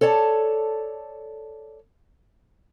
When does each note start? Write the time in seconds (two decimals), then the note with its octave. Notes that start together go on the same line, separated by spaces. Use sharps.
0.01 A4 C#5 D5 A5